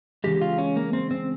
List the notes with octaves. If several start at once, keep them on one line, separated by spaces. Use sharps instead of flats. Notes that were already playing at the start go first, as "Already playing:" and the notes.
C#3 E3 G#3 G4
F4
C#4
A#3
C4
C4